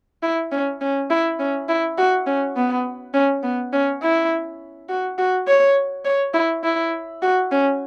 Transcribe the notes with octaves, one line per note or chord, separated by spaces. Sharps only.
E4
C#4
C#4
E4
C#4
E4
F#4
C#4
B3
C#4
B3
C#4
E4
F#4
F#4
C#5
C#5
E4
E4
F#4
C#4